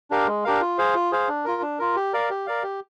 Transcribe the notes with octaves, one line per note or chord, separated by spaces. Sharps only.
D4 G4 A#4 F5
G#3
D4 G4 A#4 F5
F4
G#4 C5 F5
F4
G#4 C5 F5
D4
F4 A#4
D4
F4 A#4
G4
A#4 D5 F5
G4
A#4 D5 F5
G4